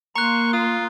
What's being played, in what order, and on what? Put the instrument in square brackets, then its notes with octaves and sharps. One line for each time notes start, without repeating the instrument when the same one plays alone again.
[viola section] A#3 C6 [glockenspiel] A#5 F#6 [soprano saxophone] C#6
[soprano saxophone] F4 [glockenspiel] D#6